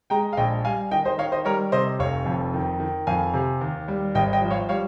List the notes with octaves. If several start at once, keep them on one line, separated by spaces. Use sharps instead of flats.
G#3 G5 A#5
F5
A#1 D#5 G5
G3 F5 G#5
D#3 D#5 G5
C5 D#5
D#3 C#5 F5
C5 D#5
G3 A#4 C#5
C3 C5 D#5
F1 C#5 F5
F2
D#3
D#3
F2 F5 G#5
C3
D#2
G3
G#1 D#5 G5
D#5 G5
F3
C#5 F5
G3 C#5 F5